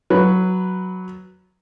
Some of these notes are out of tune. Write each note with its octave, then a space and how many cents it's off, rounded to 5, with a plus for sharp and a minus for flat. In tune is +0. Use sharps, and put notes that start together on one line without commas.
F#3 +0 B4 +0